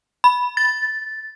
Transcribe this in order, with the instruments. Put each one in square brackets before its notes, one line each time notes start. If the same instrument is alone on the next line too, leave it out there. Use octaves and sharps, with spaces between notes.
[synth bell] B5
A6